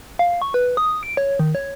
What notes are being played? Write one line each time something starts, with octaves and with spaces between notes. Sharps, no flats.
F5
C#6
B4
D#6
D7
C#5
D#3
C#5